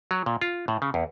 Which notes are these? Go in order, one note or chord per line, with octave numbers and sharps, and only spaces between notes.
F#3
A#2
F4
A2
C#3
E2